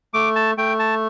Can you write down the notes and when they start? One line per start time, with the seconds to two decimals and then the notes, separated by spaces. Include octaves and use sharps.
0.14 A3 D6
0.36 A5
0.57 A3 G5
0.79 A5